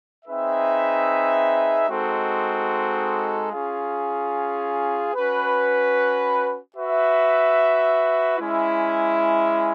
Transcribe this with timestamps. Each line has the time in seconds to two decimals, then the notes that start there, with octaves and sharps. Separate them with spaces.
0.25 C4 D#4 G#4 B4 E5
1.87 G#3 C4 D#4 F#4 A4
3.50 C#4 F4 G#4
5.13 C#4 F#4 B4
6.75 F#4 B4 E5
8.38 G#3 C#4 E4